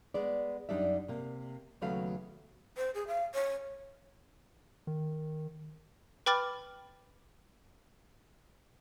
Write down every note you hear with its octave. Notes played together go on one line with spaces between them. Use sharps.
G#3 B3 D5
F#2 G3 D4 D#4 D5 E5
C3 A#3
D#2 C#3 F#3 A3 B3 F5
C5
G#4
F5
C#5
D#3
B4 G5 B5 D6 F6 A6